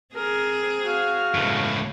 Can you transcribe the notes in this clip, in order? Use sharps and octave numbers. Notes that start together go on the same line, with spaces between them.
C4 G#4 A#4
F#4 F5
C#2 A2